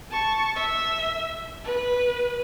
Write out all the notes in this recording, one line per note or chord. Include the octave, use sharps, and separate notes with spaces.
A5 C#6
E5
B4